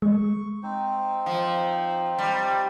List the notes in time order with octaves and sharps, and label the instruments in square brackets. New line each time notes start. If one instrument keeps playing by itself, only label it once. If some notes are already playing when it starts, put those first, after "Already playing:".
[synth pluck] G#3 [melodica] C#6
[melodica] C4 D#4 C5
[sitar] F3
G3